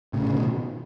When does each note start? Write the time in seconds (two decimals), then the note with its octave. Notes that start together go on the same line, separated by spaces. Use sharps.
0.13 A2 C#3
0.24 A2 C#3
0.33 B2 D#3